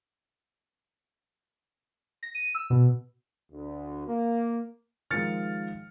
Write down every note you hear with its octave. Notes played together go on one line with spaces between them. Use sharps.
A#6
D#7
E6
B2
D2
A#3
D#3 F3 G#3 F6 A6 C#7